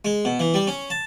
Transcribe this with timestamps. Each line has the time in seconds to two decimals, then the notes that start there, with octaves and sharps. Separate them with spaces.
0.05 G#3
0.25 B2
0.40 E3
0.54 G3
0.67 C#4
0.90 A5